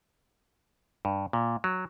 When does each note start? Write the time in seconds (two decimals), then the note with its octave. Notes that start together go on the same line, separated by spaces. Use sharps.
1.05 G2
1.33 A#2
1.64 F#3